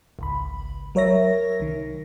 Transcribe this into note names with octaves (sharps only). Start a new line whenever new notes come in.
G#1 C#2 B5
F#3 A#4 C#5 E5 A#6
C2 D#3